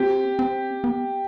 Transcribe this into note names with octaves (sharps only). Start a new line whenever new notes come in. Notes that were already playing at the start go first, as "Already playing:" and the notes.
Already playing: C4 G4
C4
B3